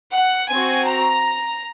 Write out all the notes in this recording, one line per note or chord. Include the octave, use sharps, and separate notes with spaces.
F#5
C4 F#4 G#5
A#5